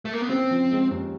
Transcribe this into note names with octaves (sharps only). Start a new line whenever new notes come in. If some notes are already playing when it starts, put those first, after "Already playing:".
A3
A#3
B3
C#3 C4
F3
G#3
D#2